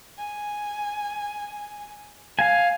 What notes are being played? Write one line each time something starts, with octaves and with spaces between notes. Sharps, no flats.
G#5
F5 G#5